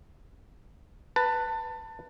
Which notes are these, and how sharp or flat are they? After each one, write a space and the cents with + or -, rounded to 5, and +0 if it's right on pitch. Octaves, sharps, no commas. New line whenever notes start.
B4 +0 A5 +25